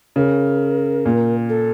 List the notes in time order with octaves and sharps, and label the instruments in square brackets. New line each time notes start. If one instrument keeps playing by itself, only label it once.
[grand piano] C#3 [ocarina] A#4
[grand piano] A#2
[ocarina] A4